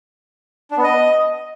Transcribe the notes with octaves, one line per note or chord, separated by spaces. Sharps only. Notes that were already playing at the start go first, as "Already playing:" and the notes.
D4
B3
D#5